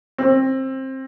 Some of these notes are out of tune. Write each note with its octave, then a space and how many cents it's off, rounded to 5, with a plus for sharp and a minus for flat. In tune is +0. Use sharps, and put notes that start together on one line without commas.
C4 +20